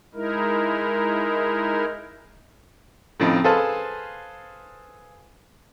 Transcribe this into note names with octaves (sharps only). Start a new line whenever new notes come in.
G#3 D#4 E4 A#4
A2 C#3 F3 C4 D#4
G#4 A4 B4 C5 F5 A5